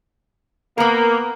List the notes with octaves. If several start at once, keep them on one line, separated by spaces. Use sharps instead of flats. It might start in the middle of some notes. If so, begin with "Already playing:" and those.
A#3 B3 A#4